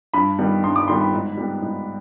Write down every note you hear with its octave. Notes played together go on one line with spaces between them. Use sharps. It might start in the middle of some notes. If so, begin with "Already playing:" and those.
G2 B5
D#3 G3 B3
G2 C6
D6
D#3 G3 B3 C6
B5
G#2
G3 B3
G#2